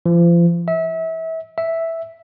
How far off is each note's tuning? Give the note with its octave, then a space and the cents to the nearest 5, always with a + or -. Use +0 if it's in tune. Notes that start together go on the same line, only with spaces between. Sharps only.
F3 -35
E5 -30
E5 -5